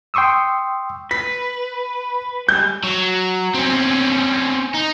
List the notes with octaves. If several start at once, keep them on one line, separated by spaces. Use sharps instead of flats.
G5 C6 C#6 D#6 E6
B4 B6
G3 G#3 G6
F#3
C4 C#4
D#4